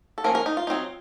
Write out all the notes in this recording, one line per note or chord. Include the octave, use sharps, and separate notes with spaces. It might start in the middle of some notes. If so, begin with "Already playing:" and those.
A4
F3 A#3 C#4 A#4
A#4
D#4
F4
F#3 C4 D#4